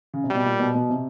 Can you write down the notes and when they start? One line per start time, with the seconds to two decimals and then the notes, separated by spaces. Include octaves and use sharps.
0.14 C#3
0.24 C3
0.30 B2 G3
0.44 A#2
0.60 B2
0.74 B2
0.90 C3